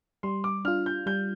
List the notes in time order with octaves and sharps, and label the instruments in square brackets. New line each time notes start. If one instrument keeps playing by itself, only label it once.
[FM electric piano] G3 [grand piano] C6
[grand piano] D6
[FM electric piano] D4 F4 [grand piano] F6
[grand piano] G6
[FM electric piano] G3 [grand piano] G6